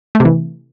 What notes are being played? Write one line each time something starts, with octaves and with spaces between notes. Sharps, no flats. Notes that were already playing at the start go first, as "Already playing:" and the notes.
A3
C3
E3